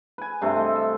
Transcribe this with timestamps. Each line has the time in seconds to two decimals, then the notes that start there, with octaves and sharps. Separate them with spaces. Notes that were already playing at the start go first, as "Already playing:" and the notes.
0.18 B4 G#5
0.41 G2 C3 A3
0.56 A4 D#5
0.76 E5